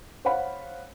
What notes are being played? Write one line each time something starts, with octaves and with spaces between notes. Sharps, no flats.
C5 C#5 F5 F#5 B5